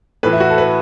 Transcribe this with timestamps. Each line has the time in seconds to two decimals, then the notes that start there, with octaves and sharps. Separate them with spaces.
0.23 A2 E3 B4
0.33 E4
0.40 F#4
0.50 A4
0.58 B4